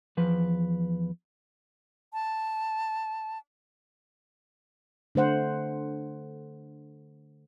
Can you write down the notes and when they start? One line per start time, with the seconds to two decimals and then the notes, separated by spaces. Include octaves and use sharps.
0.17 E2 F3 B4
2.13 A5
5.15 D3 A3 C5 F#5